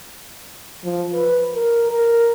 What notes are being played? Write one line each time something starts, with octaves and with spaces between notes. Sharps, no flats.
F3
B4
A#4
A#4